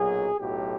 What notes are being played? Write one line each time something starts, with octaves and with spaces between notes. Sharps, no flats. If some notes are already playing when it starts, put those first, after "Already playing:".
Already playing: B1 A#2 F#3 G#4
B1 A2 F#3 G4